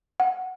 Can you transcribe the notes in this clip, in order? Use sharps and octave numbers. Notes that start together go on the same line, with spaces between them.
F#5